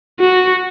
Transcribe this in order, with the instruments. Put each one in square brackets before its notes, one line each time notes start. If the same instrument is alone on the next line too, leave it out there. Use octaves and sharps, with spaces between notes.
[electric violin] F#4